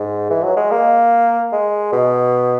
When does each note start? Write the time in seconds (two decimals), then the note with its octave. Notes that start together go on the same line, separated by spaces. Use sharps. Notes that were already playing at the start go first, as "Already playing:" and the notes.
Already playing: G#2
0.30 E3
0.43 F#3
0.57 G#3
0.71 A#3
1.52 G#3
1.93 B2